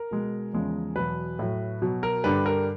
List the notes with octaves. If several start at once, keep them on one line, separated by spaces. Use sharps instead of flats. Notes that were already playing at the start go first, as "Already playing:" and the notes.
Already playing: A#4
B2 G#3
E2 C#3 F3 G#3
E2 B2 F#3 B4
A2 F#3
B2 F#3
A#4
G2 D3 G3 B4
A#4